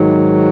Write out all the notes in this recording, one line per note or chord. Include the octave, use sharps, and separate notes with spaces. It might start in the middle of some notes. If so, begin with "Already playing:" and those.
Already playing: G#2 D#3 F#3